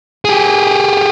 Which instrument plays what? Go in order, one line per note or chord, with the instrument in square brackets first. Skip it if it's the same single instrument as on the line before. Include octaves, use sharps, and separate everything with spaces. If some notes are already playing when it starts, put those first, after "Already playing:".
[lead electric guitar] G4 G#4